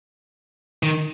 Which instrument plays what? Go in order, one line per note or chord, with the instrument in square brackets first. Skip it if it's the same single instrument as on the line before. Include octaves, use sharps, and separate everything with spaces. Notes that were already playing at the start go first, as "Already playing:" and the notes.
[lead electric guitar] D#3